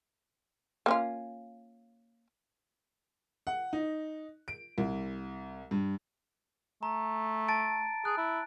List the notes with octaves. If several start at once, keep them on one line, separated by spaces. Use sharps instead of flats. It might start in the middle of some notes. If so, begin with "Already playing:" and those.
A#3 C#4 F4
F#5
D#4
D7
C2
G2
A3 A#5
A5 A6 D7
G#4 F#6
E4